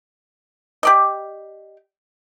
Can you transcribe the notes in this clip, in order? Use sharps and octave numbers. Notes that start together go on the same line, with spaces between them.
G4 D5 D#5